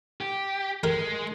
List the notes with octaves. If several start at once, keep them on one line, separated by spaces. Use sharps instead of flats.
G4
G#3 A#4